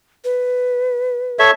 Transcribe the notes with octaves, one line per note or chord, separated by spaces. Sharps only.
B4
A4 C#5 E5